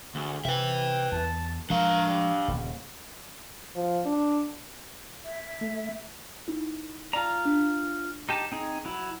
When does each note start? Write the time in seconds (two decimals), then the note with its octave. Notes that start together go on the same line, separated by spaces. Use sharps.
0.15 D2 G#4
0.45 C3 B4 E5 G5
1.12 E2 A5
1.70 F3 G#3 D4 A#4 F5
2.07 G3
2.48 D#1 D#2 C#3
3.76 F3
4.05 D4
5.25 E5
5.61 A3
6.48 D#4 E4
7.13 F4 D5 A5 A#5
7.45 D4
8.29 D#4 G4 A5
8.52 C4 D#4 G#4
8.85 F#3 E4